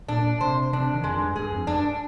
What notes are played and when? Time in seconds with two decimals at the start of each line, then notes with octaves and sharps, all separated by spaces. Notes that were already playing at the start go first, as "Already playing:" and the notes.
0.08 A#2 D4
0.41 C3 C5
0.73 C3 D4
0.94 D#3
1.04 F2 G#3
1.15 G2
1.36 G2 G#4
1.52 F2
1.67 G2 D4